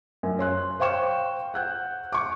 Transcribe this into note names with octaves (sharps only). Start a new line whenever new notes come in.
F#2
C#5 C6 F#6
C5 F5 G5 C#6 E7
F#5 F#6 G6
C#6 D6